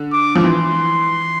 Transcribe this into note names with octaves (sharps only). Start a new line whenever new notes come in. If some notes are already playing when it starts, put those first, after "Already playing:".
Already playing: D3
D6
F3
E3 C6